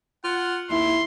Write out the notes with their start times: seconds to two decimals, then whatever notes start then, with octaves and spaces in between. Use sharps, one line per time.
0.25 F4 F#5
0.70 D#2 E4 C6